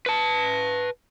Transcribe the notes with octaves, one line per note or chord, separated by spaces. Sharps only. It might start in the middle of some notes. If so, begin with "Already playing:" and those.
B4 A5